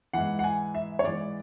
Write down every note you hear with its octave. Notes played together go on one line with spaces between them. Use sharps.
G#2 E3 F#5
F#5
G#5
E5
C#5
G#2 E3 D5